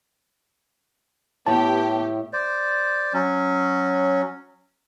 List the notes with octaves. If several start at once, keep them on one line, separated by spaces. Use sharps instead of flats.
A2 B3 G4 A5
C5 D5
F#3 C#4